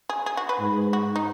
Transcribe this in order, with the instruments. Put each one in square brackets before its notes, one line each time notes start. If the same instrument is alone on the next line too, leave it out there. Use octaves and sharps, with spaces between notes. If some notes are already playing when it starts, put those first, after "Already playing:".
[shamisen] G#4
G#4
F#4
B4
[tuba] G#2
[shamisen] F#4
D#4